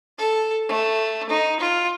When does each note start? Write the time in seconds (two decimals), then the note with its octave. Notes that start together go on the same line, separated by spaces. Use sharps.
0.18 A4
0.69 A3
1.30 D#4
1.60 F4